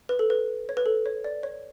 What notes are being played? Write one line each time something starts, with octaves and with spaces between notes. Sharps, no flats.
B4
A4
B4
C#5
B4
A4
C#5
D5
C#5